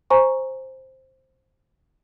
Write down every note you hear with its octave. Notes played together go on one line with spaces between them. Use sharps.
C5 G#5 A#5 C#6